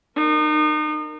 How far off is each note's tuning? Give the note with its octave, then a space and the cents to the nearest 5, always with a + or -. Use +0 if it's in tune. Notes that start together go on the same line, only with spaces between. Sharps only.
D#4 -35 A#4 +0